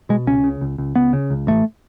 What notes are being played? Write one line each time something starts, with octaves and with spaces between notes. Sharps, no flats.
B2 G#3
C#2 C#4
C#3
C#2
C#2
C#2 B3
C#3
C#2
A1 A3